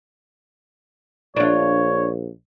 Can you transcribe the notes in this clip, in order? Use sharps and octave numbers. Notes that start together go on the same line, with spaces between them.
A#1 D4 F4 C#5